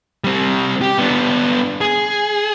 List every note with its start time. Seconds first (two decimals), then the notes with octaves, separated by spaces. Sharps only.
0.24 G3 C4
0.82 G4
0.98 B3 D4
1.81 G#4